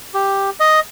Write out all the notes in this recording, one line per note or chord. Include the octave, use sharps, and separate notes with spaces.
G4
D#5